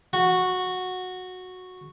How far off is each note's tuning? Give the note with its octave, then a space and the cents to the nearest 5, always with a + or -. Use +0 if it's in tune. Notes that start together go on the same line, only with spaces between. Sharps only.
F#4 -10